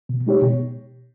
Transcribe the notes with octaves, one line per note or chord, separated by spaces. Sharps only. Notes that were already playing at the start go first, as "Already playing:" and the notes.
B2
G#3 D#4 G4 C#5
B2